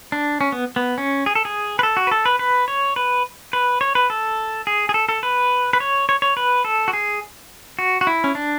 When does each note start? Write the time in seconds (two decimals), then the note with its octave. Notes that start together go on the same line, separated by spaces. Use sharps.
0.12 D4
0.41 C#4
0.52 B3
0.76 B3
0.98 C#4
1.26 G#4
1.35 A4
1.45 G#4
1.79 B4
1.83 A4
1.97 F#4
2.07 B4
2.11 A4
2.26 B4
2.39 B4
2.68 C#5
2.96 B4
3.53 B4
3.81 C#5
3.95 B4
4.10 A4
4.67 G#4
4.89 G#4
4.94 A4
5.09 A4
5.23 B4
5.73 B4
5.80 C#5
6.09 C#5
6.22 C#5
6.37 B4
6.65 A4
6.88 F#4
6.93 G#4
7.79 F#4
8.01 F#4
8.07 E4
8.24 C#4
8.35 D4